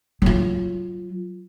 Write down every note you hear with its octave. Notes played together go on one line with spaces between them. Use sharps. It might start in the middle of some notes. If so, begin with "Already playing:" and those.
F#3 F4